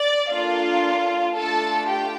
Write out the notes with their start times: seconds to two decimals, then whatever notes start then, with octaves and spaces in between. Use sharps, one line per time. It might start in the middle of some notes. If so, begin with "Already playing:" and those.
Already playing: D5
0.31 A#3 D4 F4 A4 F5
1.36 A3 D4 F4 A4 A5
1.88 G4 G5